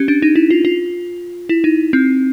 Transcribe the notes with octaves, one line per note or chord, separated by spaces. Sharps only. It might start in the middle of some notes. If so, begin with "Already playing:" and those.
Already playing: C#4 G4
D4
D#4
E4
F4
F4
E4
D#4
C4